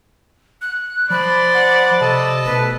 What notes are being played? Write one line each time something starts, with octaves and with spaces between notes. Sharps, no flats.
F#6
F3 C5 D5 B5
F#5
C3 A4 D#5 A5
F1 B2 B4